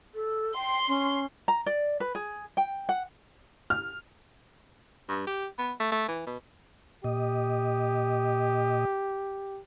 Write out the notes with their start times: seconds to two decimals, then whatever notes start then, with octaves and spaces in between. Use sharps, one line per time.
0.15 A4
0.56 G5 C6
0.88 C#4
1.48 A#5
1.66 D5
2.00 B4
2.15 G#4
2.57 G5
2.89 F#5
3.70 F6
5.09 G2
5.27 G4
5.58 B3
5.80 A3
5.92 A3
6.08 E3
6.27 B2
7.04 A#2 G4 D#5